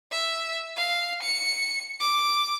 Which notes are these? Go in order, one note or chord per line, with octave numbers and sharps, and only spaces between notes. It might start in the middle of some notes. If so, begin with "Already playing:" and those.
E5
F5
C#7
D6